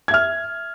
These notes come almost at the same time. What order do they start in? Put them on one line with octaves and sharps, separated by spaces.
G#6 E5 F6